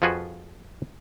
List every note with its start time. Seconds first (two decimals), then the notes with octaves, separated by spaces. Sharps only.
0.02 F2 F3 F4 F#4 G#4 B4